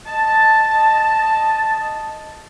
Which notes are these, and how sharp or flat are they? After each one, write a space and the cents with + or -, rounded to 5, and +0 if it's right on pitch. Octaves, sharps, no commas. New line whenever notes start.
D#5 -5 A5 +0